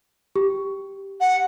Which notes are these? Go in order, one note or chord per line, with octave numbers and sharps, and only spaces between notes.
G4
F#5